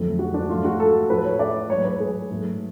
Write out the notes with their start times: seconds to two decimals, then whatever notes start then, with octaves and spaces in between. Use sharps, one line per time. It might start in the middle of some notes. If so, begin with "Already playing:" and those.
Already playing: F2 D3 F#3 A3
0.19 F#4
0.34 D4
0.49 G#2 F3 A3 F4
0.65 F#4
0.80 A4
1.10 A2 F3 A3 B4
1.24 C#5
1.39 D5
1.70 G#2 F#3 A3 C#5
1.85 B4
2.00 G#4
2.30 G#2 F#3 A3